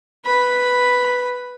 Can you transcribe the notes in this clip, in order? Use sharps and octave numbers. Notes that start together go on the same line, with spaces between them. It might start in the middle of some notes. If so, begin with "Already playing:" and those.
B4 B5